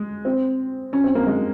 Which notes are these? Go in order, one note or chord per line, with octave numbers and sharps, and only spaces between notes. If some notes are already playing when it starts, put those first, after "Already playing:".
Already playing: G#3
C4
C#4
C4
A#3
G#3